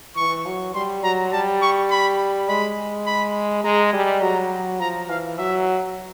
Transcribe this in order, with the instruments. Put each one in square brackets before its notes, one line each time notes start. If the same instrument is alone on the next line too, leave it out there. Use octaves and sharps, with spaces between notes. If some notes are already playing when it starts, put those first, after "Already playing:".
[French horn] E3 [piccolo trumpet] C#6
[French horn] F#3
[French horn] G3 [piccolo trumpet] C6
[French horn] F#3 [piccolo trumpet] A#5
[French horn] G3 [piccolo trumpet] A5
[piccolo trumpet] C#6
B5
[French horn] G#3 [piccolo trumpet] B5
[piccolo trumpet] B5
[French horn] G#3 [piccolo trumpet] A#5
[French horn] G3
[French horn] F#3 [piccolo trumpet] A#5
[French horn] F3 [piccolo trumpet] A#5
[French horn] E3 [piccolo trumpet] F5
[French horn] F#3 [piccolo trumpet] E5